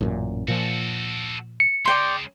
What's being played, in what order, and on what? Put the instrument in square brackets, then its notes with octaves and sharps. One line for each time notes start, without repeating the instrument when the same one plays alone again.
[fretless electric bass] A1 F#2 A#2
[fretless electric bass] A#2 F3 [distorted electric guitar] F#4 A4
[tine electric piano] C#7
[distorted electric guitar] C#3 G#3 [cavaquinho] D5 G5 C6